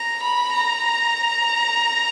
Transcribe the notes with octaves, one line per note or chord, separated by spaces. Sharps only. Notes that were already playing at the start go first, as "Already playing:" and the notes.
Already playing: A#5
B5
A#5